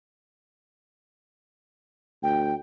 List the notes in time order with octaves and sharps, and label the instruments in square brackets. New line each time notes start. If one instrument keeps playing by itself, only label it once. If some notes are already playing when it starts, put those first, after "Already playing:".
[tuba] D2 [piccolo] G5